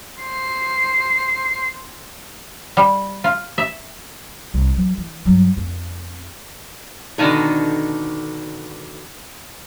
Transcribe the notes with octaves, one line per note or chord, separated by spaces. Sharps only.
C5 C7
G3
F4
E5
C2
F#2 F#3
E3
G2 F#3
F2 C4
B2 D3 D#3 D#4 A4